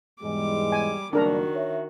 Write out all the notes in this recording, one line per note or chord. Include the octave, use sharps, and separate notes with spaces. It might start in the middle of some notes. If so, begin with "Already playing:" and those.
E2 G#2 G3 G#3 D6
G#5
F#1 D#3 G3 D4 F#4 A#4 A#5
C#5 E5